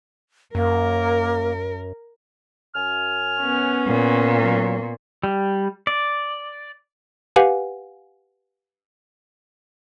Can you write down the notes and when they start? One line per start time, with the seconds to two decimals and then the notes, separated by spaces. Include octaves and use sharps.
0.55 F#2 A#3 A#4
2.75 F#2 G#5 F6
3.40 B3 C#4
3.87 A#2
4.41 F#3
5.24 G3
5.87 D5
7.36 G4 B4 F5 F#5 G#5